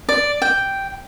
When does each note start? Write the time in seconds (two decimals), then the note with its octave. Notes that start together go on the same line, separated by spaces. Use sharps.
0.09 D5
0.42 G5